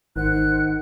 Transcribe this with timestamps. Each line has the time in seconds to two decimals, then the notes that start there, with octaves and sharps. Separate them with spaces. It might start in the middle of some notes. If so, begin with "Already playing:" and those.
0.16 G#1 D#3 C5 F#5 F#6